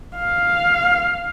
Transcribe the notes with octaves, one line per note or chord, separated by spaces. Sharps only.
F5